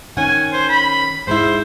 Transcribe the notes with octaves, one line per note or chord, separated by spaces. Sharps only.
D#3 C#4 F#5 G#5
C5
B5
G#2 G#3 E4 C5